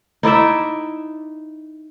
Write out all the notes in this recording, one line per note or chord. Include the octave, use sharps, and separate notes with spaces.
D#4 E4 D5 E5